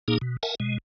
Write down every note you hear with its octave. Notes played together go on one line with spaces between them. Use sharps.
A#2 A#3 D#4 G#4
B2
A#4 E5 F#5 G#5 A5
B2 G#3